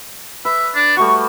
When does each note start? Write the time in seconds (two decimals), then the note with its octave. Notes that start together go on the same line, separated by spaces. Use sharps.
0.45 B4 E5
0.75 D4
0.97 G3 A3 F#4 C#6